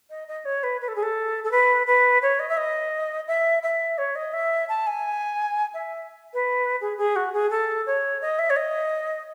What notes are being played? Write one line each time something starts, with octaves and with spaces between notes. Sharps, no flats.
D#5
D#5
C#5
B4
B4
A4
G#4
A4
A4
B4
B4
C#5
D#5
E5
D#5
E5
E5
C#5
D#5
E5
A5
G#5
E5
B4
G#4
G#4
F#4
G#4
A4
C#5
D#5
E5
C#5
D#5